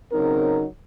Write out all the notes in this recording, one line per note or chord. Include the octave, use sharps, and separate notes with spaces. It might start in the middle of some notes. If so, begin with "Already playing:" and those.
C#3 F#3 C4 D#4 A#4